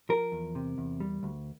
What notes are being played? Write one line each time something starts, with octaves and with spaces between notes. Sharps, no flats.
F3 A#4
E2
C3
E2
G3
D2